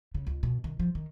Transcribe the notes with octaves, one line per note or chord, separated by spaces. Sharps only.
C#3
C#2
B2
D#3
F3
D#3